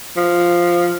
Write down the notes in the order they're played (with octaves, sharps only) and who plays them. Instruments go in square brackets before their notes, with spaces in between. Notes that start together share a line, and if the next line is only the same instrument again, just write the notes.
[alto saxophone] F3